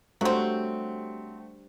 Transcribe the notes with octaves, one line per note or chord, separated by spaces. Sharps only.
F#3 G3 A3 C4 D4 F#4 C5